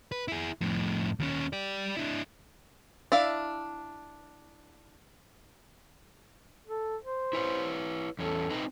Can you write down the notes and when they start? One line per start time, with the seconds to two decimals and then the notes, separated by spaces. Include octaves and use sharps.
0.12 B4
0.28 E4 G#4
0.61 F2 A2
1.20 D#2 C#4
1.53 G4 D5
1.97 D4 E4
3.12 D4 E4 E5 F5
6.66 A4
7.02 C5
7.33 E4 B4 C#5
8.19 E2 C#4 A4
8.50 C4 D#4 B4